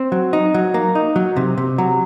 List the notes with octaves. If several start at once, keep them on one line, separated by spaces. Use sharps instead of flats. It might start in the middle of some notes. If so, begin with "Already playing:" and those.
Already playing: C4
F#3
D#4
F#3
A#3
D#4
F#3
C3
C3
F#3